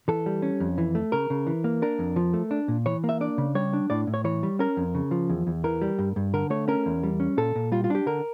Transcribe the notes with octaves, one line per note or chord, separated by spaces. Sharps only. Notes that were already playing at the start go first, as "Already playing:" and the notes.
E3 A4
G3
C#4
F2
E3
A3
C#3 A#4
C#3
E3
A#3
D4 A#4
F2
F3
A3
D4
A#2
E3 C#5
A#3
E5
D4 D5
C#3
G3 C#5
D4
A2 D5
A2
C#5
E3 C#5
G3
C#4 A#4
F2
C#3
F3
E2
E2
E3 A#4
G3
G2
G2
D3 A#4
A3 C#5
C#4 A#4
E2
G3
C#4
A#2 A4
A#2
G3 F4
F4
D4 G4
D3 A#4